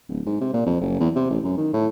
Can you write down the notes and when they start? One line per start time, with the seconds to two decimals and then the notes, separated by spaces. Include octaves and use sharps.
0.09 D1
0.26 G#2
0.41 C3
0.53 A#2
0.66 F2
0.81 F#1
1.00 E2
1.15 C3
1.30 A1
1.43 F#2
1.58 D#3
1.73 A2